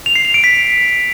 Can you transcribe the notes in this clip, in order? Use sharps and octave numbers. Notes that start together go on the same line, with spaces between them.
F7
C7
F7
D7
B6